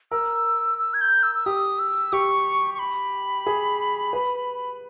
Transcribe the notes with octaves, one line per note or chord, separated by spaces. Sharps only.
A#4 E6
E6
G#6
G6
E6
E6
G4 D#6
E6
G4 C#6
C#6
B5
G#4
B4